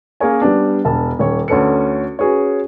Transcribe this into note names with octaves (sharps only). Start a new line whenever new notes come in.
A#3 C#4 G#4 A#4 C#5 G#5
G3 B3 D4
E1 A5
D#1 C#5
D2 C#4 A4 B4 C#7
C#4 F#4 G#4 B4 C#5